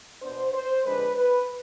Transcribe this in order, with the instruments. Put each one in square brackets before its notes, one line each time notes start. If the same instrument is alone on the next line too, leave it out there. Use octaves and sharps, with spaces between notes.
[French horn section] B2 B3 D4 C5
C5
F2 D3 G#3 D4 B4
B4